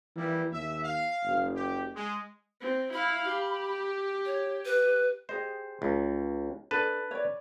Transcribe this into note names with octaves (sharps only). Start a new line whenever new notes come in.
E3 G3 A#3 E4
D#2 E5
F5
F#1
G4
G#3
C4
E4 F5 B5
G4
C#5
B4
G4 G#4 C5 D#5
C#2
D4 A4 B4 A5
C#5 D5